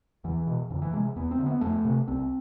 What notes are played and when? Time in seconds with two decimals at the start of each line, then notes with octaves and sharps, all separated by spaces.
0.24 E2 E3
0.47 B2
0.70 F2 D3
0.82 E3
0.93 C3 G#3
1.16 E2 B3
1.31 C4
1.39 D3
1.46 B3
1.61 F2 A3
1.85 C3
2.08 C2 C4